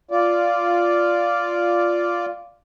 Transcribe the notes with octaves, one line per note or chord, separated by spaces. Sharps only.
F4 D5